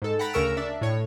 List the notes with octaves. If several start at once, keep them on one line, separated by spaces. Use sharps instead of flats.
G#2 A4
F#5 G5 A#5 B5 A6 B6
D2 C#3 A#4 C#6 E6 D7
D4 D5 E5
A2 C#5